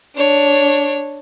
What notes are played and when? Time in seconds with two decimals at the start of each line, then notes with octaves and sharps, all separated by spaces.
0.16 D4 C#5